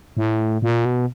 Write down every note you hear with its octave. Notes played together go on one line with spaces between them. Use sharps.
A2
A#2
B2